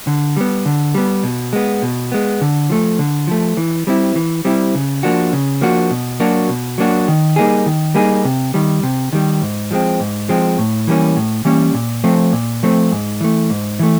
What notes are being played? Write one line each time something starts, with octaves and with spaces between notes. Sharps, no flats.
D3
G3 B3
D3
G3 B3
B2
G#3 B3
B2
G#3 B3
D3
F3 A3
D3
F3 A3
E3
G3 C4 E4
E3
G3 C4 E4
C#3
F3 A#3 D4 F#4
C#3
F3 A#3 D4 F#4
B2
F#3 A#3 D4 F#4
B2
F#3 A#3 D4 F#4
D#3
G3 A#3 D#4 G#4
D#3
G3 A#3 D#4 G#4
C3
D#3 G3
C3
D#3 G3
G#2
F3 G#3 C4
G#2
F3 G#3 C4
A2
E3 G3 A#3 C#4
A2
E3 G3 A#3 C#4
A#2
F3 A3 C4
A#2
F3 A3 C4
G#2
E3 A3
G#2
E3 A3